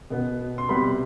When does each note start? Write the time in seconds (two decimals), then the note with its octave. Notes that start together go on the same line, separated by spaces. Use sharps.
0.10 B2 B3
0.58 C6
0.69 C3 G3 B3 B5